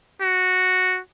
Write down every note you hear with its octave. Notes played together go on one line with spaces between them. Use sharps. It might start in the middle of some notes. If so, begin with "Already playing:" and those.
F#4